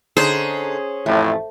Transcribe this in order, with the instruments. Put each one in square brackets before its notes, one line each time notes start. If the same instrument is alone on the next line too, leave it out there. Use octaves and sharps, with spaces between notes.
[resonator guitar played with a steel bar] D3 D#4 [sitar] C#4 G#4 [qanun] C5
[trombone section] A1 F2 A2 [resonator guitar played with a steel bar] A3